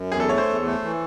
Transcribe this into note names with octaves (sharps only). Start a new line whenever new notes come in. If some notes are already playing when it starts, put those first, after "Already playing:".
Already playing: F#2
E2 G#4
A4
A3 C#5
C5
E2
A3
E3